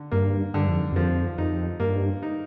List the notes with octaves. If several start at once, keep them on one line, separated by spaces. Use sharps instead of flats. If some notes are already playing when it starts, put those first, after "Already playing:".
Already playing: D3
G2 A#3
G2 D3
F2
F2 F3
F2 D#4
G2 A#3
D#4